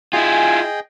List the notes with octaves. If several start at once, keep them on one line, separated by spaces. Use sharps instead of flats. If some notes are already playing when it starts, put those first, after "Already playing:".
E4 F4 G#4 D#5 G5 G#5